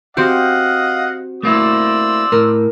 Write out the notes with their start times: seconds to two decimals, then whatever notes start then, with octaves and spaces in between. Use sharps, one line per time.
0.17 C4 F#4 G4 D#5 F5 F#5
1.43 A3 A#3 E4 C5 D5 E6
2.32 A2 A#4